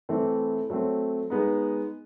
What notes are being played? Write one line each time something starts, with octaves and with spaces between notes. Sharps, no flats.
E3 A3 C4 E4
F#3 A3 C4
G#3 B3 D#4